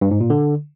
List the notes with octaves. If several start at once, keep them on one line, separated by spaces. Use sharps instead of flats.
G2
G#2
A#2
D3